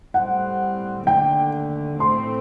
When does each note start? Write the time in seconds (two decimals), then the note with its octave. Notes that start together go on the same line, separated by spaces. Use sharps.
0.14 A2 G3 C4 F#5
1.07 D#2 D3 A3 G5
2.00 A2 A3 C4 C6